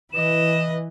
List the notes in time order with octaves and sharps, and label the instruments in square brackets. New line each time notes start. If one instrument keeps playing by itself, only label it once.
[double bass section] E3 [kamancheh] B4 D#5 [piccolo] E7